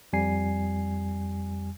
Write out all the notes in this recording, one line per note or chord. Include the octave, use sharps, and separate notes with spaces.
F2 G3 G#5 C7